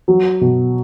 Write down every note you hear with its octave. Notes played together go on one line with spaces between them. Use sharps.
F#3
B2